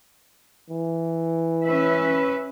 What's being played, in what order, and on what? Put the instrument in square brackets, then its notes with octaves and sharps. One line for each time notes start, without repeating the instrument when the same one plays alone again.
[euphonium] E3
[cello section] C#4 B4 E5